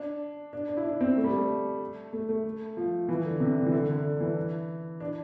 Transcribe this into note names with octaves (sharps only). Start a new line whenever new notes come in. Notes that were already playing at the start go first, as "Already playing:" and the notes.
Already playing: D4
D4
D4
E4
D4
C4
A3
G3
A3
A3
A3
F3
E3
D3
C3
D3
E3
D3
D3
E3
D4